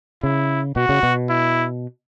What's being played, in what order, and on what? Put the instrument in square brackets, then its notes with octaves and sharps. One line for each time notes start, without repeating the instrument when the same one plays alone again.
[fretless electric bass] C#3 [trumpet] E4
[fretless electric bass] B2 [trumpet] F#4
[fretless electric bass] C#3
B2
[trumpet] E4